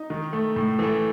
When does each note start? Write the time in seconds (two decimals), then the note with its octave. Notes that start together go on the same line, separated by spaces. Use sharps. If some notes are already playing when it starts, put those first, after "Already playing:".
Already playing: D#4
0.10 D#3
0.33 A3
0.56 A2
0.79 E3 A3